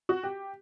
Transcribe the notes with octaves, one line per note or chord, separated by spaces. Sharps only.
F#4
G4